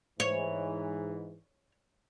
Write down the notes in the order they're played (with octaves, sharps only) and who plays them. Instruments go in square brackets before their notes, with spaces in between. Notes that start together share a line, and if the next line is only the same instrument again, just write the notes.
[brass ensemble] G#2 E3 [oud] C#5